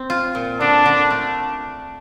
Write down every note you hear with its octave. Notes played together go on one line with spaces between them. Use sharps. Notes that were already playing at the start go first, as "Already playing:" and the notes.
Already playing: C4
F4
A#2
D3 D4
D3
A3